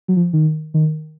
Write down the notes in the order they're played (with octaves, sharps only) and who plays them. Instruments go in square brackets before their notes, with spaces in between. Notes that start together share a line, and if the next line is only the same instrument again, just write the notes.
[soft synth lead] F#3
F3
D#3
D#3